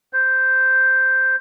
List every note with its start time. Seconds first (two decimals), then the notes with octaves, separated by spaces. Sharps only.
0.13 C5